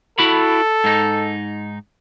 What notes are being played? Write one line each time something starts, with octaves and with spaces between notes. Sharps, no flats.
E4 F#4 A4 B5
G#2 D#4